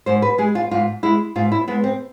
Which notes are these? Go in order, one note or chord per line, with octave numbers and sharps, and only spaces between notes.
G#2 C5
B4
G#3 G#4
F4
G#2 F4
G#3 E4
G#2 F4
E4
G#3 B3
C4